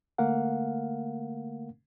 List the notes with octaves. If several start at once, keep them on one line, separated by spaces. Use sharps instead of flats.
D3 A3 A#3 A#4 F5 F#5